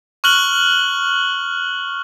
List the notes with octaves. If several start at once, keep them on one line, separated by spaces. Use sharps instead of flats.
C#6 F6 F#6 F#7 G7